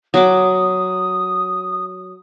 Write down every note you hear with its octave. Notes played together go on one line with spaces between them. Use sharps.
F#3 F#5 D6 D#6